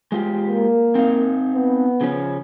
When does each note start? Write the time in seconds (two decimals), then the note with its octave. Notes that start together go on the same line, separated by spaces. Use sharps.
0.12 G#3 F4 G4
0.50 A#3
0.95 C4 D#4 F5
1.55 B3
2.01 C#3 F3 C#4